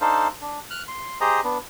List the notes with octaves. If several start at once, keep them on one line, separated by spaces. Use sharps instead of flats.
D4 D#4 A4 C5 F5
D4
F6 F#6
C6
G4 G#4 C5 D#5 A#5
B3 D4